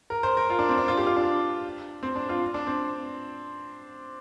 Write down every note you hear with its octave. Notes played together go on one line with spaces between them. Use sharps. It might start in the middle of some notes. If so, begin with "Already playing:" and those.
A#4
C5
A#4
F4
D4
C4
D4
F4
G4
F4
D4
C4
D4
F4
D4
C4